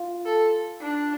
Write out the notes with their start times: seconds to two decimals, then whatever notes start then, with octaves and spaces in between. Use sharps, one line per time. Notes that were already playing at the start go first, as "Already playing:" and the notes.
Already playing: F4
0.25 A4
0.81 D4